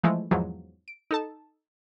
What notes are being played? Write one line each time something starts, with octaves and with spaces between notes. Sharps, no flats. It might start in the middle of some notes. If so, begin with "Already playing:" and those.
E3 F3 G#3 A3 E4
E2 G#2 F3 F#3
D7
D#4 A4 A5